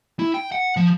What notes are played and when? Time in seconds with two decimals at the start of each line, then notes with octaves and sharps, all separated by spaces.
0.19 E4
0.34 G5
0.52 F#5
0.77 F3